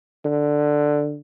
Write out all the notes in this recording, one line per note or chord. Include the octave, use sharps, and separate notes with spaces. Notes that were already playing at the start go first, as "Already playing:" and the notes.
D3